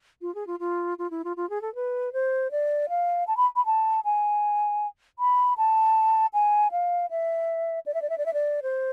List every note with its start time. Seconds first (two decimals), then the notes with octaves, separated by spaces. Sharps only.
0.21 F4
0.35 G#4
0.47 F4
0.59 F4
0.98 F4
1.10 E4
1.24 F4
1.37 F4
1.50 G#4
1.61 A4
1.75 B4
2.13 C5
2.51 D5
2.89 F5
3.27 A5
3.37 B5
3.56 B5
3.66 A5
4.05 G#5
5.19 B5
5.58 A5
6.33 G#5
6.71 F5
7.10 E5
7.86 D5
7.94 E5
8.02 D5
8.10 E5
8.18 D5
8.26 E5
8.33 D5
8.62 C5